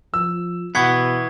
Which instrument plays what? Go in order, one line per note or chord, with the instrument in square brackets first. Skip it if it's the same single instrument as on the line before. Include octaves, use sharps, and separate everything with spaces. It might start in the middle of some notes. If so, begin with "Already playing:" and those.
[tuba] F3 [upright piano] E6
[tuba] B2 [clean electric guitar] E3 B3 [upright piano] F#5 [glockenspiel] C#6 G#6 C7